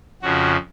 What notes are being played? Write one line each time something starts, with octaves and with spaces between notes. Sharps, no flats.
F2 C#3 F3 F#4